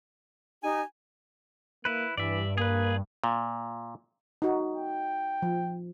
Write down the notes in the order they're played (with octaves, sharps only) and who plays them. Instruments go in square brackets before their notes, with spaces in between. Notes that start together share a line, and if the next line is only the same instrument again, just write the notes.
[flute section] D#4 G4 [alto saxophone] G#5
[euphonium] A#3 [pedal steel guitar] E4 B4
[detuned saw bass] G2 [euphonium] E3 [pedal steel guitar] D5 E5
[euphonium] A#3 [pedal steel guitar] G#4 B4
[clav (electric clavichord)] A#2
[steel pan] D#4 F#4
[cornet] G5
[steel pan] F3